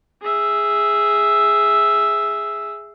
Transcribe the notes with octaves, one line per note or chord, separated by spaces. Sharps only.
G#4 E5